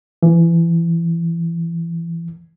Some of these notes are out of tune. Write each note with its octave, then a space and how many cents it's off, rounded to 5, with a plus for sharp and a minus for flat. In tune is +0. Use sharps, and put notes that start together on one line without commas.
E3 +25